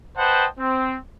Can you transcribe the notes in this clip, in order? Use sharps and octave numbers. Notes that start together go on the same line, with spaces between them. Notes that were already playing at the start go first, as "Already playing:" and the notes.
B4 C5 D#5 F#5 G5 A5
C4